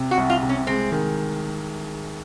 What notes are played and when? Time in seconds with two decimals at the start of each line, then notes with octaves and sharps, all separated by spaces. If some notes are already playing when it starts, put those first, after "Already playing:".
Already playing: C3
0.11 F#4
0.17 C2
0.30 F4
0.43 C3
0.49 C#4
0.67 G#3 C4
0.92 D#3